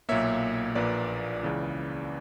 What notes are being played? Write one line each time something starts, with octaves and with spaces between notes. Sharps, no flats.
B1 A#2 A#3 C#5 E5
A#1 A#2 A#3 B4 D5
C#2 C#3 E3